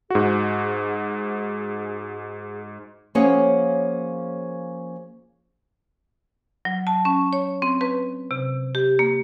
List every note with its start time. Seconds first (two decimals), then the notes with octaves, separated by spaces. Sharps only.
0.10 G#2 F#4 G#4
3.15 F3 A#3 C#4 G#4 C#5 F#5
6.65 F#3
6.87 A5
7.05 C#4
7.33 C#5
7.62 C4
7.81 B4
8.31 C3
8.75 G4
8.99 A#3